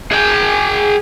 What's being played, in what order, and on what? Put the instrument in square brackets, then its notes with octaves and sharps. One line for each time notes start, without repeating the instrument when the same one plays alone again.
[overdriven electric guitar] G#4 G5